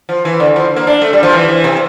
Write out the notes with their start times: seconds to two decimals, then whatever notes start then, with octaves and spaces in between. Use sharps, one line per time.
0.09 F3
0.25 E3
0.40 D3
0.56 F3
0.76 A#3
0.87 D4
1.02 A3
1.13 G3
1.23 F3
1.33 E3
1.49 E3
1.64 C3